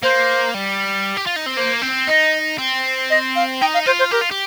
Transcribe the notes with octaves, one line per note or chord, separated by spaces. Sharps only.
A#3 C5
G3
G4
F4
D#4
C4
A#3 C5
C4
D#4 D#5
C4
D#5
F5
D#4 G5
F5
F4 C5
C5
G4 A#4
F4
G4